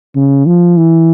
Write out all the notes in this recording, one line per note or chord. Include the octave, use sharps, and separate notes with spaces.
C#3
F3
E3